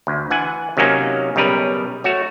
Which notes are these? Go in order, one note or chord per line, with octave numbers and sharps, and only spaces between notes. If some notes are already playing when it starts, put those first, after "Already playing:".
D2
E3 F#5 G#5
C3 D#3 F#3 A#3 C#4 D#4
B1 C#3 G3 A#4 B4
A3 F#4 C#5